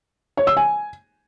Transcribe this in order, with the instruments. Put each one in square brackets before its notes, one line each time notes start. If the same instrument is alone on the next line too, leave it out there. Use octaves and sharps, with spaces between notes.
[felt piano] C#5
E6
G#5